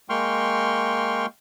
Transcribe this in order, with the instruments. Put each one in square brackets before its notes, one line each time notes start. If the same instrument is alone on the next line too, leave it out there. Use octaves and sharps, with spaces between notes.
[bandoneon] G#3 A#3 G5 C6 C#6 F6